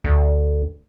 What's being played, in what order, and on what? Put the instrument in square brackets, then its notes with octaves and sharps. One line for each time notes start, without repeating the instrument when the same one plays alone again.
[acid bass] D2